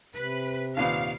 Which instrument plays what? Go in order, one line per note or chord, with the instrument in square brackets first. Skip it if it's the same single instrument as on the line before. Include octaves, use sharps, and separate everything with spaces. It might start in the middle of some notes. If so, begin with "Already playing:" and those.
[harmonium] C3 [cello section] B4
[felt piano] D#2 A#2 B3 [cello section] F5